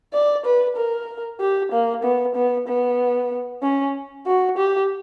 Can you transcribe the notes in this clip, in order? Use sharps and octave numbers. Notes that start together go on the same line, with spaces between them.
D5
B4
A#4
G4
A#3
B3
B3
B3
C#4
F#4
G4